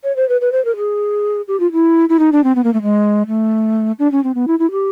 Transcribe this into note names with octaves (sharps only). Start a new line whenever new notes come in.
C#5
C5
B4
B4
C5
A#4
G#4
G4
F4
E4
E4
D#4
D4
C4
B3
A#3
A3
G#3
A3
D4
C#4
C4
B3
E4
E4
G4